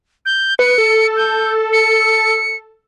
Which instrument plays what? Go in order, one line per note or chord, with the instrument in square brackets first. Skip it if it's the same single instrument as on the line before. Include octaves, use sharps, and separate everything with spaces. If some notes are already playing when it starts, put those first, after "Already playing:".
[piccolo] G6
[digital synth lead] B4 [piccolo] C#7
[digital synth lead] A4
[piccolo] G6
C#7